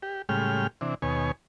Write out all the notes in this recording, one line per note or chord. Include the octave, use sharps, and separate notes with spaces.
G4
A2 C#3 G3 G#3 G5 F6
C3 E3 D4
D#2 B2 C#5 G#5